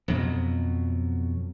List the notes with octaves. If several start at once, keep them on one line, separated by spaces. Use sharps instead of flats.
F2 B2 F#3